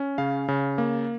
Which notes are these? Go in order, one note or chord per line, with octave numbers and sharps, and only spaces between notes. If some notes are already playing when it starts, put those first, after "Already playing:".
Already playing: C#4
C#3 F5
C#3
A#3